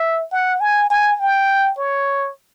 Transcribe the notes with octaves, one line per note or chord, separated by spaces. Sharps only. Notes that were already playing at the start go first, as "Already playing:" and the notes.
Already playing: E5
F#5
G#5
G#5
G5
C#5